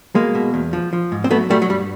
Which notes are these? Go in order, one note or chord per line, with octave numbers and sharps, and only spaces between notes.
B2 G#3 A#3
B2
E2
F3
F3
G#2
C4
F#3 A3 B3
F#3 G3 A3
F#3
G2 G3